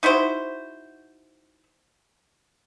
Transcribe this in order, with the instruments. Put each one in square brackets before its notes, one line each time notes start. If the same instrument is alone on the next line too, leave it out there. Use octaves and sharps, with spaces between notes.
[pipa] D#4 E4 F#4 C5